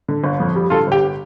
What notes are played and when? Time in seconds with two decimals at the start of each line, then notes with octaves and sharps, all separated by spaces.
0.08 D3
0.24 G1
0.40 F2
0.56 G3
0.70 D3 F4 A4
0.87 G1 G4